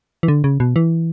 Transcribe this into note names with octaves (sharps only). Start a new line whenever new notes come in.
E3
D3
C#3
B2
E3